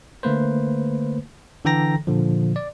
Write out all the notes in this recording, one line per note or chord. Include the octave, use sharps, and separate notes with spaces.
D3 A3 A#3 B4 C5
D3 E3 A4 G5 A#5 A#6
A#2 D3 F3
D5